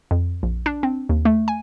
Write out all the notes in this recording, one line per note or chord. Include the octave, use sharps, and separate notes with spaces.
F2
A#1
D4
C4
D#2
A3
G#5